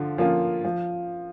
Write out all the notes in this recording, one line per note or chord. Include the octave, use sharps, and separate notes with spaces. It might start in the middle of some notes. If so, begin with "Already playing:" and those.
Already playing: D3 F3 F4
F3 A#3 C#4 F4
F3